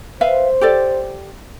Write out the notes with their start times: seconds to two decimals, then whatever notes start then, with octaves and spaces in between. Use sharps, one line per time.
0.21 B4 C5 E5 F5
0.61 G4 A4 D5